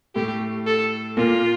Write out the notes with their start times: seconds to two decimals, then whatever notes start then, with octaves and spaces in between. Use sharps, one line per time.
0.15 A2 A3 G4
0.67 A4
1.17 A#2 A#3 F4